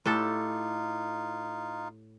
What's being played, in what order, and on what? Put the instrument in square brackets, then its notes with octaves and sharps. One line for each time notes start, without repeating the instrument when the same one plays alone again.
[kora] A2 G4 A4 [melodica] D#4 F4